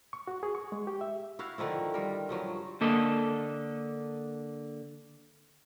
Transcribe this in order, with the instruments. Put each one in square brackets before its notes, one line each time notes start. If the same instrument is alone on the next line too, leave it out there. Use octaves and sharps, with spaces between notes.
[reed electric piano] C#6
F#4
G#4
C#6
G#3
G4
E5
[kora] E4 F#4 F5
D3 D#3 F3 E4
G3 A#4
G2 F3 F#3
[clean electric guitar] D3 A#3 A4 D#5